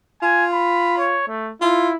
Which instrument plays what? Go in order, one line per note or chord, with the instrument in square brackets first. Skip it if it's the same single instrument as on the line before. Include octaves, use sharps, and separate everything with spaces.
[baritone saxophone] F4 [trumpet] G#5
[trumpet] B5
C#5
A3
[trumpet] E4 [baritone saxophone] F4